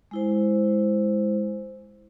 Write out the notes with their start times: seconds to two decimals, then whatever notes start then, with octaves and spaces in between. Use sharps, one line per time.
0.11 G#3 E4 C5